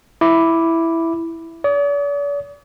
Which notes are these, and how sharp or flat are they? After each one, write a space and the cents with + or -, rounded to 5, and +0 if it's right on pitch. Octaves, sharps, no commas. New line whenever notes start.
E4 +0 D6 +0
D5 -45 D#6 +0